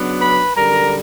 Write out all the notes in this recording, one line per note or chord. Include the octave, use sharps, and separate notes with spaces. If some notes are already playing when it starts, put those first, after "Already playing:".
Already playing: C#3 F#3 B3 D4
B4 B5
F#2 D3 G3 A#4 A#5